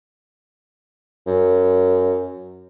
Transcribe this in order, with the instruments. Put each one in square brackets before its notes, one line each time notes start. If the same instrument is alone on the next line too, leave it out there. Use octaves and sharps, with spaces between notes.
[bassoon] F#2